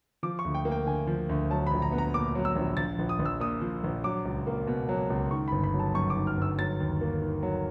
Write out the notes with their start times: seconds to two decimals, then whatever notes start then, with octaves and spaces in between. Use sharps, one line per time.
0.23 F3 D6
0.39 C#6
0.44 D2
0.54 G5
0.65 A#3
0.72 G5
0.86 D3 G#5
1.07 F3
1.29 D2
1.50 F#3 A5
1.67 B5
1.71 A#1
1.82 A#5
1.92 B3
1.98 A#5
2.14 A#2 D6
2.35 F#3
2.45 E6
2.56 A#1
2.77 F3 A6
2.99 A#1
3.09 D#6
3.19 A#1
3.26 E6
3.40 A#2 D#6
3.61 F3
3.84 A#1
4.04 F#3 D6
4.25 C#2
4.47 A#3
4.67 B2
4.89 F#3
5.10 C#2
5.31 D#3 C#6
5.48 B5
5.52 G1
5.64 B5
5.74 F#3
5.79 A5
5.94 F#2 C#6
6.10 D6
6.17 D#3
6.27 F6
6.37 G1 E6
6.58 F#3 A6
6.80 D#2
7.01 A#3
7.21 D#3
7.43 F#3